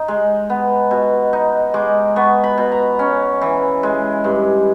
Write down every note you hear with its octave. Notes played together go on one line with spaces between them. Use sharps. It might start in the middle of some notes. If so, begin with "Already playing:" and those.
Already playing: D#4
G#3
B3
B2
D#4
G#3 D6
B3 C#6
B5
B2
A#5
C#4
E3
G#3
G2